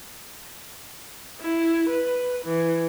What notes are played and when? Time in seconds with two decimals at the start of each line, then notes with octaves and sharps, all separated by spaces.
1.41 E4
1.89 B4
2.44 E3